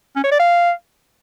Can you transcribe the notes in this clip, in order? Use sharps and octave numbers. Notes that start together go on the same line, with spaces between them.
C#4
C#5
D5
F5